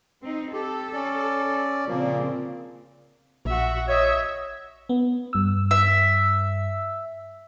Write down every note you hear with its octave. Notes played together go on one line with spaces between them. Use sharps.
C4 D#4
G4 A4
C#4 D5
A#2 C#3 F3 A#3 C4
A#1 F#4 E5
C#5 D#5 E5
B3
G2 E6
E5